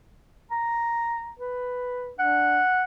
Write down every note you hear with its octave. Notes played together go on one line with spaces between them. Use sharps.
A#5
B4
D4 F#5